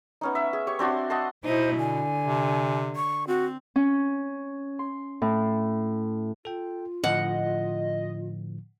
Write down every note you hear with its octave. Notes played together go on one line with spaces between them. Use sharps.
B3 C#4 D#4
E5
G#4
G4 C#5 C#6
C4 D4 F#4 C6
D#5 F#5 A5 C6
B2 D#4 E4 C5
D3 G#5
C3
C#6
C4 F#4
C#4
C6
A2
F4 A4 G5
A2 D3 F3 D#5 F#5